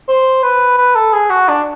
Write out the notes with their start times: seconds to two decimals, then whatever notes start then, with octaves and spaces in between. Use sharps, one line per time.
0.09 C5
0.43 B4
0.78 B4
0.95 A4
1.13 G#4
1.30 F#4
1.48 D4